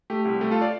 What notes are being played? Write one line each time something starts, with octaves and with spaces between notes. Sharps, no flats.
A3 G4
C2 G4
A3 G4
F4 A4
D5 F5